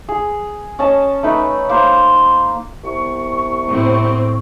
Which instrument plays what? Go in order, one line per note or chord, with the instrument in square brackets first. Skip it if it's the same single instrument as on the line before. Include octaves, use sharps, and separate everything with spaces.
[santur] G#4
C#4 D#5 A5
A3 D#4 B4
A#3 C5
[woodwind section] C2 B3 C#6
[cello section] A2 C4